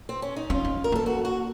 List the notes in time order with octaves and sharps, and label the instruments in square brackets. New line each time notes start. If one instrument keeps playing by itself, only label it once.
[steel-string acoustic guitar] C4
C#4
D#4
[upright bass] C#4 [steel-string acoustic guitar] F4
[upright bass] C#4
[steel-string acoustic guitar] A#4
[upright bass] A#3 [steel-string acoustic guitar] A4
[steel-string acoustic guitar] F#4
F#4